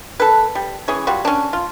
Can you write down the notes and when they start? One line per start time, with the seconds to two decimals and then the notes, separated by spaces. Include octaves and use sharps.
0.20 A4 B4
0.55 G3
0.88 E3 C#4 G#4 C#5
1.07 G3 F4 F#4
1.25 C#4 D4
1.53 F4